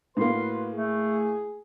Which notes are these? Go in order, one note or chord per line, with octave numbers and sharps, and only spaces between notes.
A2 A#3 F#4 B4 C6
A3 G#4